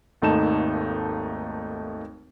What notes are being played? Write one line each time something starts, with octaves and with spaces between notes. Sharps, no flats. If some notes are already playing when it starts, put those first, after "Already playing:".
G#1 D#2 A3 D#4 A5 E7